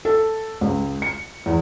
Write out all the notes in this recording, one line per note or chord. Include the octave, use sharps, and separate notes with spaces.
A4
C#2
C#7
E2